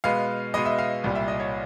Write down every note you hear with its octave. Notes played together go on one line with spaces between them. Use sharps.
B2 G#3 B3 F5
B2 G#3 B3 D#5
E5
F5
C2 A#2 G3
E5
D#5
C#5